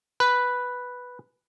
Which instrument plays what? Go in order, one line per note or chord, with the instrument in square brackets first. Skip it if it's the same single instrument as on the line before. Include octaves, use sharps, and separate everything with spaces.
[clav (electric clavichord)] B4